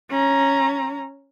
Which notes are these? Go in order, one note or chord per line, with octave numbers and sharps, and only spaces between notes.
C#4 A#5